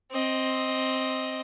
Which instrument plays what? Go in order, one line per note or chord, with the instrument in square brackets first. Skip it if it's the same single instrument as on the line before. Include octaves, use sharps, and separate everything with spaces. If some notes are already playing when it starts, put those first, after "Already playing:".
[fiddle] C4 D#5